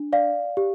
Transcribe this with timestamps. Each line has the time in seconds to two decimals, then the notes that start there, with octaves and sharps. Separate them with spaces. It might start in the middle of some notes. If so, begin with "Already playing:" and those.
Already playing: D4
0.13 D5 F5
0.57 G4